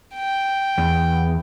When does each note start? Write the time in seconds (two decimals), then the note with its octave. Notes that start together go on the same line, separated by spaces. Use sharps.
0.15 G5
0.78 E2